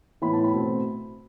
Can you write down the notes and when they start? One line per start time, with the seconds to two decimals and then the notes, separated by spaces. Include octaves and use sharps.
0.22 A2 E3 B3 B5
0.33 A5
0.44 B5
0.53 B2 A3 C4